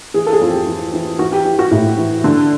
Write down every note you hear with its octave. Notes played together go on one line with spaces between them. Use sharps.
E3 G#4
A4
G#4
F2
G4
E3
E3
E3 F#4
G4
E3 G4
F#4
A2 E4
E3
D3